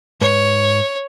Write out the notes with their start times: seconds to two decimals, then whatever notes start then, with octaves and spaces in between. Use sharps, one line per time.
0.21 G#2 B4 C#5